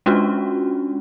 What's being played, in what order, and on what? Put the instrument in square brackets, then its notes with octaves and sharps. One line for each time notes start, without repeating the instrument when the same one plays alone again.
[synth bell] G#3 C#4 D4 F4 F#4